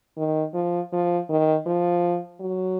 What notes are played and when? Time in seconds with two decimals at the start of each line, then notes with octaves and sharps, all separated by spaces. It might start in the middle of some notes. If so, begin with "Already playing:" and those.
0.17 D#3
0.54 F3
0.92 F3
1.29 D#3
1.66 F3
2.42 F#3